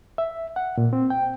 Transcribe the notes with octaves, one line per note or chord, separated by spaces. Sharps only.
E5
F#5
A#2
C4
G5